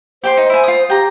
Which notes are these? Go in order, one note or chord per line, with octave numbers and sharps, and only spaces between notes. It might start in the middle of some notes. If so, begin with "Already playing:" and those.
G4 C5 G5 C6
D#4
E4 G#5
F4 D#6
G4 G5 A#5